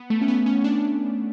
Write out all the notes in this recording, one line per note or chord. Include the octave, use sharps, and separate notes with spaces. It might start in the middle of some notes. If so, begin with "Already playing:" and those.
Already playing: B3
A3
C#4
B3
C#4
D4